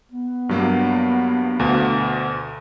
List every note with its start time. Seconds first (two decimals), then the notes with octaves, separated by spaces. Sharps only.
0.11 B3
0.49 G2 F#3 A#3
1.59 D2 B2 F5